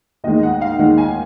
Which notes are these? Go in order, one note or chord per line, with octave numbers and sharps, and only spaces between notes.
D#2 D#3 G#3 D#5
F#5
F5
D#2 D#3 G#3 F#5
G#5